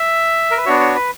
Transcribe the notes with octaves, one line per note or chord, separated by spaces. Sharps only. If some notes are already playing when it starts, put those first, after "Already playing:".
Already playing: E5
A#4
B4
B3 D4 F#4 C#5
C#5
B4